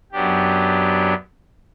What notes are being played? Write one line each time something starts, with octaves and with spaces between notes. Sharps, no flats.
F#2 F#3 B3 D4 G4